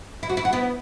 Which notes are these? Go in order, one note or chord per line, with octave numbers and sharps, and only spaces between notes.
E4
F#4
E4
F#4
B3 E4